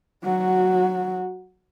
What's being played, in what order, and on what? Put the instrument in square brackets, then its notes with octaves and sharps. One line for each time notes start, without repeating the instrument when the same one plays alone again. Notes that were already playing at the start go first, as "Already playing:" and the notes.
[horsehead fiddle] F#3 F#4